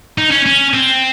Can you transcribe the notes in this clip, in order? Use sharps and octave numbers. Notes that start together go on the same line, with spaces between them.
D#4
C#4
C#4
C4